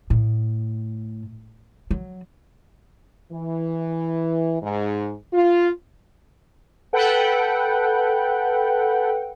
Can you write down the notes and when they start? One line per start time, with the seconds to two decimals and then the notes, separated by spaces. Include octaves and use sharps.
0.10 A2
1.91 F#3
3.32 E3
4.62 G#2
5.33 F4
6.93 A4 B4 F#5 G5